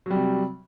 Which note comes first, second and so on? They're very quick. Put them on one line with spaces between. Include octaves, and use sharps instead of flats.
F#3 G3 C3